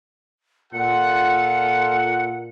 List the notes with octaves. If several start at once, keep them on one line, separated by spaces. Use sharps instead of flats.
A#2 F4 A4 F#5 C#7